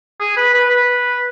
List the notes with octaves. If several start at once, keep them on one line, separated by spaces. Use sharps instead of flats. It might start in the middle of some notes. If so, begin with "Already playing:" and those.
G#4
B4
B4
B4